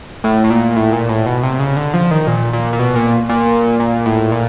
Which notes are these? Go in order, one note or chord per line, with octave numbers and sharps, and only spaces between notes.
A2
A2
A#2
A2
A#2
A2
B2
C3
C#3
D3
F3
D#3
A#2
A#2
A#2
B2
A#2
A#2
A#2
A2
A#2